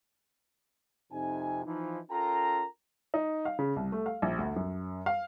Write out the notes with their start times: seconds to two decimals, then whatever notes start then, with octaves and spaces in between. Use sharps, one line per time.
1.12 F2 C3 D#4 G#5
1.66 E3 F3 D#4
2.11 C#4 F4 A4 A#4 G5 A#5
3.14 D#4
3.45 F5
3.59 C#3
3.76 C2
3.92 A3
4.06 F5
4.22 A#1
4.38 D2
4.56 F#2
5.06 F5